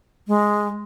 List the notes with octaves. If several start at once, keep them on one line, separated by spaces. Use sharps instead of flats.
G#3